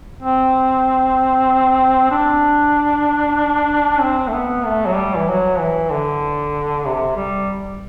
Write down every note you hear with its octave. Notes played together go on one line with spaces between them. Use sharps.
C4
D4
C4
A3
B3
A3
F#3
G3
E3
F#3
E3
D3
C3
G3